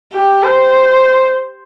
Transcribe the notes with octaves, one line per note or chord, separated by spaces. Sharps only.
G4
C5